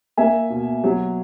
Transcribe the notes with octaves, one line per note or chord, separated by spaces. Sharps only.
A#3 E5 G#5
B2
F#3